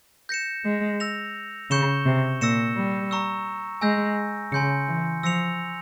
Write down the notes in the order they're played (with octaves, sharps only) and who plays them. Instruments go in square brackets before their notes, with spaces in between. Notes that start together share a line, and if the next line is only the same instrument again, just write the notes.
[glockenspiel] G6 A#6 C#7 E7
[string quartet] G#3
[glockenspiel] E6 A#6 F7
[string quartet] C#3 [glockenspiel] C#6 G6 C#7 E7 G7
[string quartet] C3
[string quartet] A#2 [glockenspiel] E6 A#6 C#7 E7
[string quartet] G3
[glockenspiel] A#5 C#6 E6
[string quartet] G#3 [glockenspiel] G#5 E6 G6 A#6
[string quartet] C#3 [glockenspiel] G#5 C6 G6 C#7
[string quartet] E3
[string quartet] F3 [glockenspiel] E6 A#6 C#7 F7